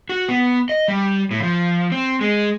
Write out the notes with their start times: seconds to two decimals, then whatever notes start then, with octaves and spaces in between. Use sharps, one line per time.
0.09 F#4
0.28 B3
0.69 D#5
0.88 G3
1.31 A2
1.43 F3
1.92 C4
2.21 G#3